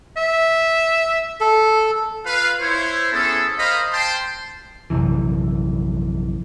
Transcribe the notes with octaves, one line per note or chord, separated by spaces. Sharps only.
E5
A4
F4 B4 F5
E4 C5 C#5
B3 C#4 E4 G#4 A4
A#4 C5 D#5 F5 A#5 B5
C5 G5 A5 C6
A#1 F#2 C3 E3